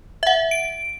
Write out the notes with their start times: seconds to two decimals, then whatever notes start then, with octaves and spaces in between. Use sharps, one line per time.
0.23 E5 F#5
0.51 D7